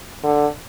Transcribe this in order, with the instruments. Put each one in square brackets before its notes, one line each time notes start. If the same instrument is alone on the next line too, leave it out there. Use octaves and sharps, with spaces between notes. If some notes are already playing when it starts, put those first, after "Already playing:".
[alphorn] D3